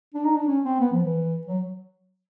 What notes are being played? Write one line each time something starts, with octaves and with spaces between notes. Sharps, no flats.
D4
D#4
D4
C#4
C4
B3
F3
E3
F#3